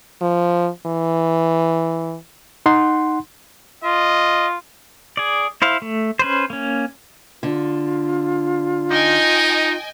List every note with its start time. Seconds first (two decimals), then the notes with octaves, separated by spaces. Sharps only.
0.21 F3
0.86 E3
2.66 D#4 F#5 C6
3.84 F4 D#5
5.17 G#4 D5
5.62 E4 C5 F5
5.82 A3
6.19 C#4 B4 C5
6.50 A#3 C#4
7.43 D3 F4
8.91 D#4 D#5 G5 G#5